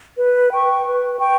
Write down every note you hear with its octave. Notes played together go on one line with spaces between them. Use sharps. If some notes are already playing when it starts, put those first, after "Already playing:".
B4
G5 C#6
B4
G5 C#6